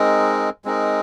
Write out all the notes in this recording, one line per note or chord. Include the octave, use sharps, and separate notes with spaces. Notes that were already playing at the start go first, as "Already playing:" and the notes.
Already playing: G#3 C4 D#4 A#4
G#3 C4 D#4 A#4